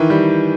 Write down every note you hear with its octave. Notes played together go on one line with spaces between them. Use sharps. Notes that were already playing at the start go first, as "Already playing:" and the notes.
Already playing: D#3 E3
G3